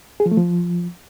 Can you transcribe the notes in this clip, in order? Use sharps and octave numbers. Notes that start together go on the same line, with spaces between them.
G#4
F3
A3
F3